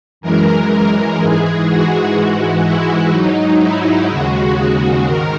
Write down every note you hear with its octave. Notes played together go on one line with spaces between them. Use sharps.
F#2 E3 G#3 A#4
G#2 E3 G#3 G#4
F#4
G#2 E3 G#3
E4
G#2 F#3 D#4
E4
D#2 C#3 G#3 F#4
G#2 D#3 A#4